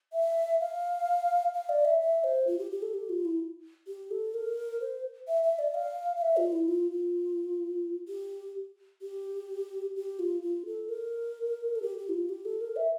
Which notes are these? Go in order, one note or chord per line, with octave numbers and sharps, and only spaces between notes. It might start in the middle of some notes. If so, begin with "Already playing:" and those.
E5
F5
F5
D5
E5
E5
C5
F4
G4
G4
A4
G4
F4
E4
G4
A4
A#4
C5
E5
E5
D5
F5
F5
E5
F4
E4
F4
F4
G4
G4
G4
F4
F4
A4
A#4
A4
G4
G4
E4
F4
G4
A4
A#4
E5